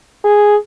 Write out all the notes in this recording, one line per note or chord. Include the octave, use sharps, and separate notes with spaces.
G#4